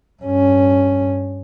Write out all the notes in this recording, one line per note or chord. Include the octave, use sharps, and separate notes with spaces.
G2 C#4